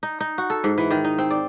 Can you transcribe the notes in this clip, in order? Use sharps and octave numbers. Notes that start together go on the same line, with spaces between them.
D#4
D#4
F#4
A4
G#2
E3
D#3
D#4
C4
D5